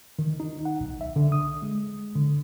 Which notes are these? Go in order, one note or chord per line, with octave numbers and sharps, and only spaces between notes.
D#3
D#4
F#5
B1
E5
D3
D#6
G#3
D3